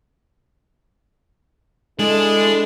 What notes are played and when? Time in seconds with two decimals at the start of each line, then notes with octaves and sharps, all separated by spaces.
1.99 G#3 D4 E4 A4